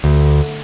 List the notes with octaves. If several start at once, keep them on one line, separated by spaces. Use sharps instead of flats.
D2